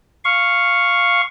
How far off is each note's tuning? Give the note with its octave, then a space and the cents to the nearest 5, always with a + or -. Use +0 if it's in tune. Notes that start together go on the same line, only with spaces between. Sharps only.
F5 +0 C#6 +0